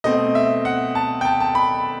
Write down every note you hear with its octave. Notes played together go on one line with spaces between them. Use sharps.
B2 A3 C4 D#5
E5
F#5
A5
G5
A5
A5
B5